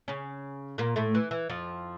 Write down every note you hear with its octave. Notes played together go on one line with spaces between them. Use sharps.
C#3 C#4
A#2 A#3
A2 A3
E3
E3
F2 F3